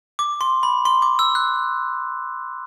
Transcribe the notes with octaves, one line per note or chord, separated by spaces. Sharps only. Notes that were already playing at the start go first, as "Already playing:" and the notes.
D6
C6
B5
C6
D6
E6
F#6